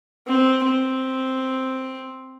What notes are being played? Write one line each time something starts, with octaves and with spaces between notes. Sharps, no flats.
C4
C4